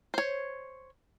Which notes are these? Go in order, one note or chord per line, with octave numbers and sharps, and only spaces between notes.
C5 C#5